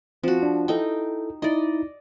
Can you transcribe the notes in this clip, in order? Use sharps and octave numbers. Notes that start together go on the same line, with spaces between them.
F3 C4 F#4
D4
D#4 E4 A4 G5
D#4 E4 D5 D#5